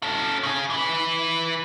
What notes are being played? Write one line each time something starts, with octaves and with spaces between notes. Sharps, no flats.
C#4 A4
C#3 G#4
E3 B4